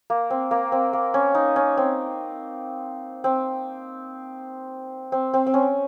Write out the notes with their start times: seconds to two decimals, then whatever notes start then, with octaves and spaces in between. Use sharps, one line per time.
0.10 A#3
0.30 C4
0.51 A#3
0.72 C4
0.93 A#3
1.14 C#4
1.35 D#4
1.56 C#4
1.78 C4
3.24 C4
5.12 C4
5.34 C4
5.46 C4
5.54 C#4